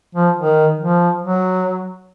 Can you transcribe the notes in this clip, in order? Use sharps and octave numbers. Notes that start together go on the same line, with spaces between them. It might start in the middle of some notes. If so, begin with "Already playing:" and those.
F3
D#3
F3
F#3